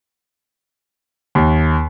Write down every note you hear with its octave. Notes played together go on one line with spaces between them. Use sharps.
D#2